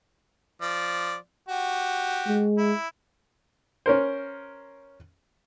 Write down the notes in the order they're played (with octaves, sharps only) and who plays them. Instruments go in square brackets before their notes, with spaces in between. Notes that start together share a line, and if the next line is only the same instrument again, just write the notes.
[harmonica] F3 D5
F#4 G4
[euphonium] G#3
[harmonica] E4
[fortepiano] C#4 A#4 C5